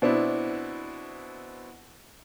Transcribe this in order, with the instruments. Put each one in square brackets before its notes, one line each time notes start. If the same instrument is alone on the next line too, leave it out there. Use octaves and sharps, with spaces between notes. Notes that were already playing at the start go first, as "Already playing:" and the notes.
[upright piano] B2 C4 D4 E4